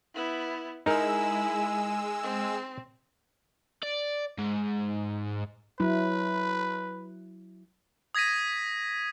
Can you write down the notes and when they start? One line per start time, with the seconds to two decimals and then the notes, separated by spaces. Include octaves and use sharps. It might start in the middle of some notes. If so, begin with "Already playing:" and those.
0.14 B3 E4
0.86 G#3 D#4 E4 A#4 G#5 E6
2.23 C4
3.83 D5
4.38 G#2
5.80 F#3 E4 B4
8.15 D#6 G#6 A#6 B6 D#7